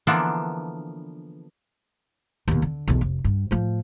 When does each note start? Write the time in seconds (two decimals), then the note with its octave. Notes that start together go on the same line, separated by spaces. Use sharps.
0.07 D3 E3 F3 A#3 B3 D4
2.48 D#2 B2
2.62 D3
2.88 B1 E2
3.01 F1
3.24 G2
3.51 A2 F3